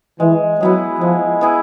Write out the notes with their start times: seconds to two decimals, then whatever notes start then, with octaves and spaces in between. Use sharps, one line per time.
0.20 E3 G#3
0.60 F#3 B3 E4 G#4
1.00 F3 G#3
1.41 B3 E4 G#4